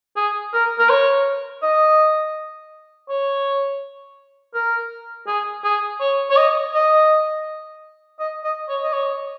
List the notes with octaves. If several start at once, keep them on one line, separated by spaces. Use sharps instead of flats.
G#4
A#4
A#4
C#5
D#5
C#5
A#4
G#4
G#4
C#5
C#5
D#5
D#5
D#5
D#5
C#5
D#5
C#5